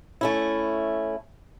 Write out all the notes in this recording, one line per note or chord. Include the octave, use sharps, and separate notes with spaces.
A3 C#4 E4